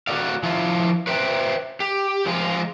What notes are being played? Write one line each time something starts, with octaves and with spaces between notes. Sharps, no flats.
F#4 G4 A4 D5 F5
F3 E4 F4
B4 C5 E5 G5
G4
F3 G#3 F4